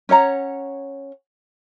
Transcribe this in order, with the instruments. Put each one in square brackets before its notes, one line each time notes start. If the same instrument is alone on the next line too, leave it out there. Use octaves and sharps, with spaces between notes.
[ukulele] C#4 C#5 F#5 A#5